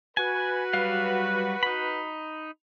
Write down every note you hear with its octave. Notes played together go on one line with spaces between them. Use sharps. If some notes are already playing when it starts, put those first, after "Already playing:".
F#4 B4 G#5
F#3 G3 F5
D#4 B5